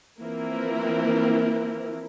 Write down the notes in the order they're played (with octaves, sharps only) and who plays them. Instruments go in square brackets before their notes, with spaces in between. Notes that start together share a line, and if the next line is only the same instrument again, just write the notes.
[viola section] E3 F3 A#3 C4 E4 A#4